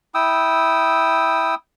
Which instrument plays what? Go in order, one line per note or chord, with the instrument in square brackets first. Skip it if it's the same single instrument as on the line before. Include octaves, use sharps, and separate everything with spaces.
[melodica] E4 G5 D#6 E6